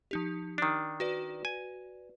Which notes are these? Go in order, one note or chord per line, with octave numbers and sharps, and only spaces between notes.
F3 D#4 G4
D#3 D4
F#4 B4 D5
G#5